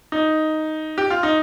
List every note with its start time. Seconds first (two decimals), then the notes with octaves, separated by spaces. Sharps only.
0.12 D#4
0.98 G4
1.10 F4
1.23 D#4